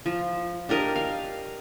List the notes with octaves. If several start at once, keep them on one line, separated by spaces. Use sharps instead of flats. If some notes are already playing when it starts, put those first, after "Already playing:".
F3
D4 G4 A#4 D#5
F5